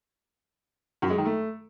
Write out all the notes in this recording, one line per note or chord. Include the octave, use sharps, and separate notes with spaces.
F#2
G#3
D#3
A3